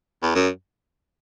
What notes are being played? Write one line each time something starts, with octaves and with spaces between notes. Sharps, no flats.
E2
F#2